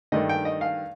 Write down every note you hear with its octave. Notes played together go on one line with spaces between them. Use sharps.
G2 D#3 A3 D#5
G5
D#5
F5